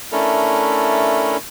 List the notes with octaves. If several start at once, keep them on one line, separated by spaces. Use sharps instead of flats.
A3 C#4 D4 E4 A4 A#4